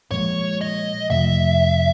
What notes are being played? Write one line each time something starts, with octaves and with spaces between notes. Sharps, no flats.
A#2 F3 G#3 C#5
D#5
F2 C3 F3 A3 E5